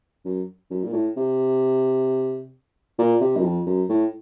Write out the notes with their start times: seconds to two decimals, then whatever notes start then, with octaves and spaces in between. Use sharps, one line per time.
0.25 F#2
0.70 F#2
0.84 A#2
0.93 A2
1.17 C3
2.98 A#2
3.20 C3
3.36 F#2
3.44 F2
3.66 F#2
3.89 A2